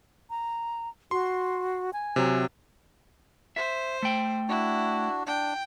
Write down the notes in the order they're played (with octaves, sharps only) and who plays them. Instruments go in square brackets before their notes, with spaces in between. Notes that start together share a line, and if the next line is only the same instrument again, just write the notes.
[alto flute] A#5
[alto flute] F#4 [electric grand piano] C6
[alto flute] G#5
[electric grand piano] C3 F#3
[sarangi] C5 [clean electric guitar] E5
[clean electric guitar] A3 G5
[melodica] D4 F#4 [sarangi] E4
[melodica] D4 [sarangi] G5